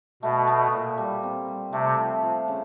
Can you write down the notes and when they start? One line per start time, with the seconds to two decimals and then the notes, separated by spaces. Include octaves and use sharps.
0.23 B2 A3
0.47 A3
0.73 A#2
0.98 G3
1.23 C4
1.48 G3
1.72 C3 A3
1.98 F3
2.22 F3
2.48 C#3